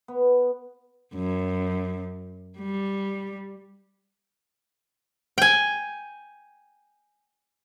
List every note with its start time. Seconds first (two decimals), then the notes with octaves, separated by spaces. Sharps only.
0.08 B3
1.15 F#2
2.58 G3
5.38 G5 G#5